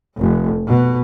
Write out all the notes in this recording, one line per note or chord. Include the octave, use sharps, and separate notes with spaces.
F1
B2